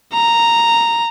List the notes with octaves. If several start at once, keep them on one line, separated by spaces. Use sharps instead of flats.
A#5